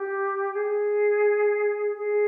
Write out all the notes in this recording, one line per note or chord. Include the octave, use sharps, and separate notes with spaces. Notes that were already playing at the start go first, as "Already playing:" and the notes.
Already playing: G4
G#4
G#4